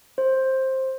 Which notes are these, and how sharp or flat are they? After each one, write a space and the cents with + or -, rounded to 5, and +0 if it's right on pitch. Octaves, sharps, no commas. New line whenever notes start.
C5 +10